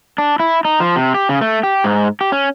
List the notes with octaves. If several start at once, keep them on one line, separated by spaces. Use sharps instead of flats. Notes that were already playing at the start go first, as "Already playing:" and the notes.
D4
E4
D#4
F3
C3
G4
C#3
A3
G4
G#2
G4
C#4